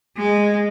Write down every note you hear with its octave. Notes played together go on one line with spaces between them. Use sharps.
G#3